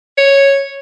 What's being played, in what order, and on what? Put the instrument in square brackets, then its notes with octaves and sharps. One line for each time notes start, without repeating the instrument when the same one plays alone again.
[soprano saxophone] C#5